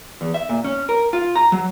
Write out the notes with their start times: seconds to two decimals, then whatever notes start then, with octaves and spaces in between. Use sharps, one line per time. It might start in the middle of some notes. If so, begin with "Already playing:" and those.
0.21 E2
0.34 E5
0.49 A#2
0.64 C#4
0.89 A#4
1.13 F4
1.36 A#5
1.52 F#3